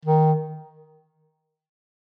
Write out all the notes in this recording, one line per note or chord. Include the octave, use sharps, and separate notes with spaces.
D#3